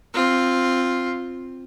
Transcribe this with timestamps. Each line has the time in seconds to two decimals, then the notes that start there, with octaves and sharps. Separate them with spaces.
0.14 C4 F4